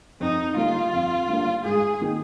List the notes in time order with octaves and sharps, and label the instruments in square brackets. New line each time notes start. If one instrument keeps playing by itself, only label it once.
[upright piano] F2 [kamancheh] D#4
[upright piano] D3 G3 A#3 D4 [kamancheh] F4
[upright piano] F2
D3 G3 A#3 D4
[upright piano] G#2 [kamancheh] G#4
[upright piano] D#3 A#3 D#4